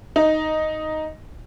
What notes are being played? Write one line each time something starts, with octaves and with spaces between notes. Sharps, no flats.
D#4